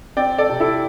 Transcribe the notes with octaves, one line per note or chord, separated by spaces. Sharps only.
C4 D5 G5
A4 D5
C3
E4 A4